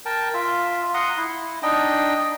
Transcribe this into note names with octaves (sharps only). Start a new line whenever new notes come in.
A#4 G5 A5
F4 E5
F#5 A#5 C6 D#6
E4
D4 D#4 D#5 G5